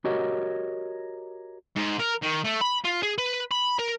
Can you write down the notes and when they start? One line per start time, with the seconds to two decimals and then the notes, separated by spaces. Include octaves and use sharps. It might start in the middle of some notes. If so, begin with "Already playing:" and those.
0.05 F#4 G4 A#4 C#5 D#5
1.76 G#2
2.00 A#4
2.22 D#3
2.44 A3
2.61 B5
2.84 F4
3.03 G#4
3.18 B4
3.51 B5
3.79 A#4